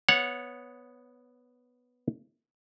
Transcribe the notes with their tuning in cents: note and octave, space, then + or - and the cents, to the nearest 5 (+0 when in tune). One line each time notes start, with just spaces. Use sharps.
B3 +0 C#5 +0 F#5 -20